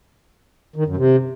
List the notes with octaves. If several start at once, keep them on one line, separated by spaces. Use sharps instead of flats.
D#3
F#2
C3